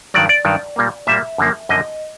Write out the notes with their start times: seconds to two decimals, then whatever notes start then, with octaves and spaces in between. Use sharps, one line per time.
0.14 G2 D#3 F#3 D5
0.29 D5
0.45 G2 D#3 F#3
0.76 A#2 G3 A#3
1.07 A#2 G3 A#3 E5
1.38 F#2 D3 F3 A#3
1.69 F#2 D3 F3 A#3 D#5